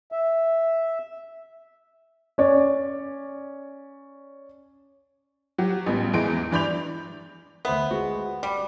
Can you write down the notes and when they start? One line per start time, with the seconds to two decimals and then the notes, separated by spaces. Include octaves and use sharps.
0.12 E5
2.38 C#4 C#5 D5
5.58 F#3 F#4 G4
5.86 A1 G3 B3
6.13 E2 E3 G#3 D7
6.51 G2 E3 D5 B5 G6 F7
7.65 D2 B3 C5 E5
7.91 G#3 F#4
8.43 G3 D6